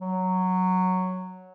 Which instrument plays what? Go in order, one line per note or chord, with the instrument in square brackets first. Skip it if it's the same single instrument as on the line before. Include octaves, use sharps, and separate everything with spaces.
[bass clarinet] F#3